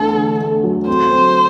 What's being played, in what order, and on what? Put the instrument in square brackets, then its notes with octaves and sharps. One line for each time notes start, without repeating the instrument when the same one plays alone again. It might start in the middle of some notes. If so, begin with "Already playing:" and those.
Already playing: [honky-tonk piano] E2 D3 A3 [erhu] A4
[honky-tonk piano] D3
A3
F#3
[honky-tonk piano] C4 [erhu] C5
[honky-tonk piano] C4